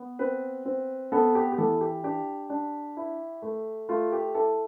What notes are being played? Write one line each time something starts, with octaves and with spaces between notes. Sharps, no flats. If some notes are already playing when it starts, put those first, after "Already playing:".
Already playing: B3
C4 B4
C4
B3 A4
G4
G4
E3 A4
G4
D4 G4
D4
E4
A3
A3 F4
G4
E4 A4